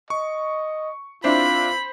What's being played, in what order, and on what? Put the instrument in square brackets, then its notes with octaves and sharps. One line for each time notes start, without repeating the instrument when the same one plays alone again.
[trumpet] D#5 [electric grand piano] C#6
[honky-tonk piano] C4 D4 E4 [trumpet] F4 [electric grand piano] C5 [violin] B5